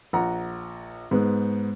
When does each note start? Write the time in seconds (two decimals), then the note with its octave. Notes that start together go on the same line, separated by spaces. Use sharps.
0.13 A#1 F#5 A#5
1.11 G#2 G#3 B3